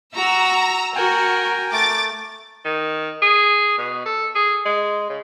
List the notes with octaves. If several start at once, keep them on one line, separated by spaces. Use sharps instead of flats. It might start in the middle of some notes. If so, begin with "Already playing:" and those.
F#4 A#5 E6
F#4 A#4 G5 G#5
A3 D6 A6
D#3
G#4
B2
A4
G#4
G#3
C#3